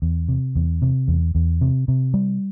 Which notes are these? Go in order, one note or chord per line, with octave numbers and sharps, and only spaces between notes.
E2
C3
E2
C3
E2
E2
C3
C3
G3